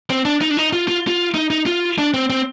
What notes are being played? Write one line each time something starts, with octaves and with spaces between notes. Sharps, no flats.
C4
D4
D#4
D4
D#4
F4
F4
F4
D#4
D#4
F4
D4
C4
C4